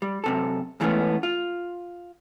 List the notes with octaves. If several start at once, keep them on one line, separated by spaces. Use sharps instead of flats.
G3
F#2 C3 A4
G#2 E3 G3 A3 B3 C#4
F4